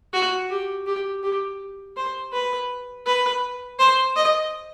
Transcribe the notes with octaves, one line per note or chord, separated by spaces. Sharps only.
F#4
G4
G4
G4
C5
B4
B4
C5
D#5